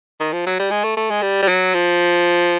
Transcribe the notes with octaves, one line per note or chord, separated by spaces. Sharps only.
D#3
F3
F#3
G3
G#3
A3
A3
G#3
G3
G3
F#3
F3